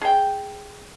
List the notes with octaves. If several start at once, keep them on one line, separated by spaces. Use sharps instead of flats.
G#4 G5